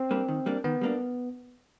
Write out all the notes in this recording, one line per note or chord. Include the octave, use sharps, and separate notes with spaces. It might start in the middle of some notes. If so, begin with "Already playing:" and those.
Already playing: C4
G3 A#3 D4
D#3
G3 A#3 D4
D#3 B3
G3 A#3 D4